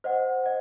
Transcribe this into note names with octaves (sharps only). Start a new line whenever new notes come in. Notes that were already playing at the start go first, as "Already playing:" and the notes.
C5 D#5 F#5
D#5 F#5